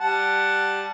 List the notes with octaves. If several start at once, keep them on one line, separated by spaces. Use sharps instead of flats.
G3 F#5 A5